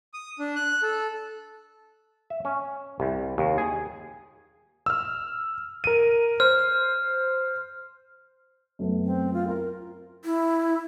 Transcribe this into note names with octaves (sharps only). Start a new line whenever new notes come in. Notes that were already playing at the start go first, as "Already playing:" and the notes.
D#6
D4
F#6
A4
E5
C#4
C2
D#2
G#4
E6 F6
A#4 D#7
C5 F6
F#2 A3 B3
C4
F4
A#4 C6
E4